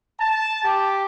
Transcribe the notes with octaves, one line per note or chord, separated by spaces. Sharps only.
A5
G4